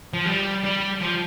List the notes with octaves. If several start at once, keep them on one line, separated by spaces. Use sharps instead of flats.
F3
G3
G3
F3